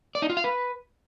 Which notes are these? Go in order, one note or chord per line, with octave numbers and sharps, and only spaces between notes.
D5
D#4
F4
F5
B4